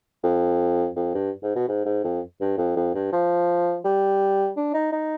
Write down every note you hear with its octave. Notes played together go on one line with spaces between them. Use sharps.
F2
F2
G2
G#2
B2
G#2
G#2
F2
G2
F2
F2
G2
F3
G3
D4
D#4
D#4